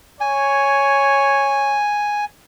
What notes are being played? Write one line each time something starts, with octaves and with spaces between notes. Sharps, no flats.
C#5 G#5